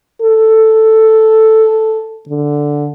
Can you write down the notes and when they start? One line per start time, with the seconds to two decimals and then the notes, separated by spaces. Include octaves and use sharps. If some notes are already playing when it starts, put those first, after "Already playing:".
0.21 A4
2.29 D3